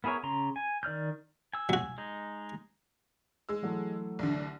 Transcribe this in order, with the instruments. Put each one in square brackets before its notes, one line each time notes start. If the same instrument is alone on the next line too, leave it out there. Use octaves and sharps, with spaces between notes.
[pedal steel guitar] B3 E4 G#4 A#4 C#5
C#3 A#5 C6
G#5
D#3 D5 F6 G6
G#5 E6
[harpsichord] F#3 F#4
[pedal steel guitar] G#3 D#4
[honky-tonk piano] G#3 E6
[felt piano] E3 F#3 A3
[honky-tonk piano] C2 D3